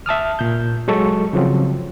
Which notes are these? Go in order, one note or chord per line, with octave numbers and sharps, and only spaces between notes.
E5 A5 D#6 F6
A#2 G6
F#3 G#3 A4 C#6
C#3 F3 F#3 C4